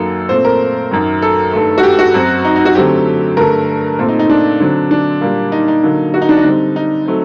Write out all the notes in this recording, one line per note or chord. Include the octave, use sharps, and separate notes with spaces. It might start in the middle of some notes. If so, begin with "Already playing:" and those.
Already playing: F#2 D#3 F#3 A#3 A4
A#2 A3 C4 C5
A#4
F#2 D#3 F#3
A4
G2 D#3 A3
F#4
G4
F#4
F#2 F#3 C4
D#4
D#4
F#4
D3 F#3 A3 C4 G4
G2 D3 A3 A#4
A#2 A3 C4
D#4
D#4
D4
D3 F#3 C4
D4
A#2 G3 A#3
D#4
D#4
D3 F#3 A#3
F#4
D#4
D4
D#4
D3 G3 C4
D#4
F#3 A3 C4